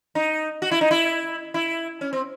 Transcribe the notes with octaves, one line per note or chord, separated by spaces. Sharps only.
D#4
F#4
E4
D#4
E4
E4
C#4
C4